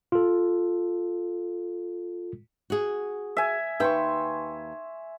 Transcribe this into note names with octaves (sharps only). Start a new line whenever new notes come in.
F4 A4
F#4 G#4
E5 G#5
D#2 B4 E5 G5 C6 C#6